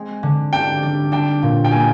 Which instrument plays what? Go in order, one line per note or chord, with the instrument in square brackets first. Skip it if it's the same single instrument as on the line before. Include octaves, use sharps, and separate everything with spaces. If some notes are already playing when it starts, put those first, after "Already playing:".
Already playing: [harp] G#3 C4
D3
[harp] D4 [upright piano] G5
[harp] G3
[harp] D4 [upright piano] G5
[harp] A#2
[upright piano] G5
[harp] A#3 [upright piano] G#5